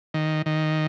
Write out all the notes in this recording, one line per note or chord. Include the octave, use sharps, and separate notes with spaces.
D#3
D#3